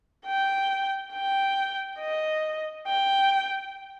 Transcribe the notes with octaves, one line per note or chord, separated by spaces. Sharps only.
G5
G5
D#5
G5